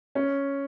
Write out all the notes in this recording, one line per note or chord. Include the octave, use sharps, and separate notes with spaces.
C#4